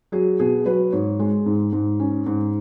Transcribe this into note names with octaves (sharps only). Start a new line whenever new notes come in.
F#3 G#4
B2 G#4
F#3 B4
G#2 C#5
G#3
G#2
G#2
C#4
G#2